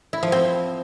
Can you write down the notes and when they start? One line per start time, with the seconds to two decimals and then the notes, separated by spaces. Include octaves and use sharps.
0.13 E4
0.23 F3
0.32 C4